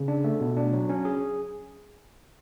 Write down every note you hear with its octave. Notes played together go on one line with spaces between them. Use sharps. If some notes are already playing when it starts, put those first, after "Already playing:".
Already playing: C#3
D4
A3
B2
D4
F#3
C#4
G#4